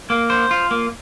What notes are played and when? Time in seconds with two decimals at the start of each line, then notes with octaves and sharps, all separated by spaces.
0.10 A#3
0.30 C5
0.51 F4
0.71 A#3